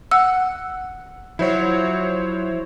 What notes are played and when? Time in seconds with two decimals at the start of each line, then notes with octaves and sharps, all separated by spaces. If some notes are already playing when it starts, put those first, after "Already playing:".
0.11 F#5 E6
1.39 F3 F#3 E4 F#4 C5 C#5